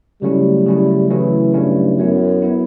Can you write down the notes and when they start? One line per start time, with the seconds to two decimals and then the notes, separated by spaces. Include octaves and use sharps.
0.22 C#3 F#3 G3 A3 C#4 E4
0.66 C#3 F#3 A3 C#4 E4
1.10 C#3 E3 F#3 A3 C#4 E4
1.54 G2 C#3 F#3 A3 C#4 E4
1.98 F#2 F#3 B3 E4
2.42 F#3 B3 E4